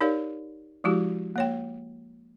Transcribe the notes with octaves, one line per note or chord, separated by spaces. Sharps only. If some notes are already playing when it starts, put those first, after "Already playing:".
D#4 G4 A#4 C#5 D5 F5
F3 G#3 E4 F#4 G4
A#3 C#5 G5